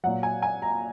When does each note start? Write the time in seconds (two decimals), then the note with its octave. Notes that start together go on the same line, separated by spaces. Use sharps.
0.04 A#2 F#3 F#5
0.23 G#5
0.42 G#5
0.62 A#5